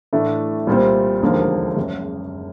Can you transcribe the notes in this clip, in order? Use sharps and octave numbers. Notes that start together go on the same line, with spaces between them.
A2 E3 A3 D4
C2 A#2 G3 C4
E1 D#2 D3 F3 A#3
F#1 F#2 C#3